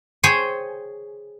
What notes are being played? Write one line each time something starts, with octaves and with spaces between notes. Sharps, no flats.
G#4 C5 C#5 G5 G#5